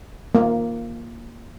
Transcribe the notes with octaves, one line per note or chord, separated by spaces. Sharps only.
A#3